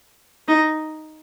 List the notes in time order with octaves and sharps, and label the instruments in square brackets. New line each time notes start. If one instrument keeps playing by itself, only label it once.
[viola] D#4